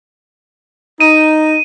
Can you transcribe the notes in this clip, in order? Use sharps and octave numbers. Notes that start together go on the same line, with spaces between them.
D#4 D#7